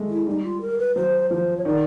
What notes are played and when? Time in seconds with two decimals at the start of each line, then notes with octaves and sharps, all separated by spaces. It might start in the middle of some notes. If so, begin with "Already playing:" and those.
Already playing: G#3 A3
0.09 E4
0.27 G3 D#4
0.44 F4
0.61 A#4
0.79 B4
0.96 F#3 C5
1.31 F3 C5
1.57 C#5
1.65 D#3 D5